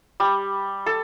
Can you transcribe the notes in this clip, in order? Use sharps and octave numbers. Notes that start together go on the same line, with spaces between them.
G3
A4